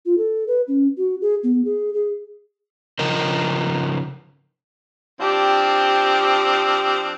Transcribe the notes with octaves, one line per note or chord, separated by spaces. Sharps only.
F4
A4
B4
C#4
F#4
G#4
B3
G#4
G#4
C#3 F3 A#4 D#5
F3 C4 D4 G4